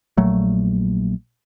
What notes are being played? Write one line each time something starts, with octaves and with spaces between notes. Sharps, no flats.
A#1 A#2 F#3 A3